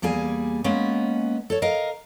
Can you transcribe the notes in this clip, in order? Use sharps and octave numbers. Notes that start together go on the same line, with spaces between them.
E2 G3 A#3 G#4 G#5
G#3 A#3 B3 C#4
A4 C#5
A#4 D#5 F5